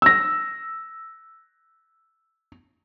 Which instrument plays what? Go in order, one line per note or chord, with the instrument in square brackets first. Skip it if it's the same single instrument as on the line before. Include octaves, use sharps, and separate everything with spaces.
[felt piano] E6 A#6